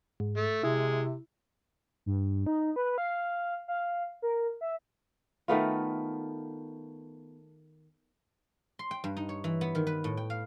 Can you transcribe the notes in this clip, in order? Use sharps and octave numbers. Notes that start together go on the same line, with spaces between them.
G#2
A3
C3 G#3 E4
G2
D#4
B4
F5
F5
A#4
E5
D#3 A3 B3 F4
C6
G5
G2
D#4
C#5
E3
B3
D#3
B4
A2
G5
F5